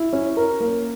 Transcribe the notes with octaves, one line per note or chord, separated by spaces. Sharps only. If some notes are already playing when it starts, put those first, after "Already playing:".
Already playing: E4
C#4
A#4
A#3